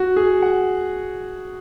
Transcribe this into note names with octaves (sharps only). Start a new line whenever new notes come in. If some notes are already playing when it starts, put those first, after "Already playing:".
Already playing: F#4
G#4
F#5